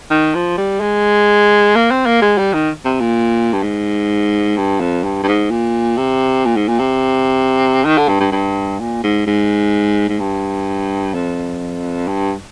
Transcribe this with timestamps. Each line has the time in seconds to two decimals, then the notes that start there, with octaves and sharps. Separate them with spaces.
0.10 D#3
0.35 F3
0.58 G3
0.81 G#3
1.75 A#3
1.91 C4
2.06 A#3
2.22 G#3
2.38 G3
2.53 D#3
2.85 C3
3.00 A#2
3.53 G2
3.63 G#2
4.57 G2
4.81 F2
5.04 G2
5.23 G2
5.28 G#2
5.51 A#2
5.97 C3
6.45 A#2
6.56 G#2
6.68 A#2
6.79 C3
7.85 D#3
7.98 D3
8.09 G2
8.20 G2
8.32 G2
8.80 A#2
9.04 G#2
9.27 G#2
10.09 G#2
10.20 G2
11.15 F2
12.08 G2